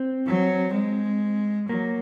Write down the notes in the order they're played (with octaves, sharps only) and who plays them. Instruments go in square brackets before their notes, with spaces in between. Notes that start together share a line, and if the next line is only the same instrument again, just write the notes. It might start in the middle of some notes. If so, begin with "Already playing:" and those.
Already playing: [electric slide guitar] C4
[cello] F#3
G#3
[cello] F#3 [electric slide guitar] A#3